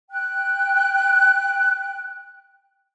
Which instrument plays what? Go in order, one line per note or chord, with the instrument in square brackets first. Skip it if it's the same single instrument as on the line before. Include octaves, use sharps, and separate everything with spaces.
[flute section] G5 F#6